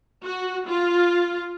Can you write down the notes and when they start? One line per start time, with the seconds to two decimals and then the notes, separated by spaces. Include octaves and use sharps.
0.24 F#4
0.68 F4